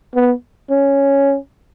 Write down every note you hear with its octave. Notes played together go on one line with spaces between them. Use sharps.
B3
C#4